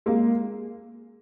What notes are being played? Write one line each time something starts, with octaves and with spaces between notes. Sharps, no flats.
G#3 A#3